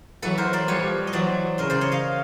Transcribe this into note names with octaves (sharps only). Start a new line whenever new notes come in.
E3 F#3 A4 B4
A#4 C5
C5 D5
F3 G3 B4 C#5
D#5
E3 F#3 C5 D5
C#3 A#4 C5
C5 D5
C#5 D#5
D#5 F5